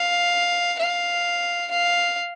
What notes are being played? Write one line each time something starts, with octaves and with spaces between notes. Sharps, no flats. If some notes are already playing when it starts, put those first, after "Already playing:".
Already playing: F5
F5
F5